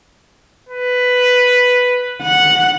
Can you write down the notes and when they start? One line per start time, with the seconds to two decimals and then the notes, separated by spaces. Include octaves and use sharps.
0.69 B4
2.22 F#5